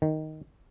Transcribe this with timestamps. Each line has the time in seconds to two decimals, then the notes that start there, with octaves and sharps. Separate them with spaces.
0.02 D#3